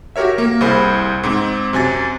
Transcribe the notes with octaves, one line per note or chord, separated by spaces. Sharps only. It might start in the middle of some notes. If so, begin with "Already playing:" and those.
F#4 G4 A#4 C#5 E5
A#3 A#4
C2 G#4 C5 B5
G#2 C4
F#2 C3 G#5 A6